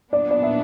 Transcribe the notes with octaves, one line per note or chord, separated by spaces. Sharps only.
A#2 F#3 B3 D4 D5
D5
E5